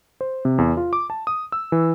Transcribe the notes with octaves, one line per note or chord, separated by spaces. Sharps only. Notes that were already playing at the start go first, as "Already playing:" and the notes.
C5
C3
E2
F4
D6
A5
D#6
E6
E3